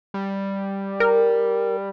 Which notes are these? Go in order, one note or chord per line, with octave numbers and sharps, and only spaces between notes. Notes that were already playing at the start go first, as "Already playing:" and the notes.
G3
A#4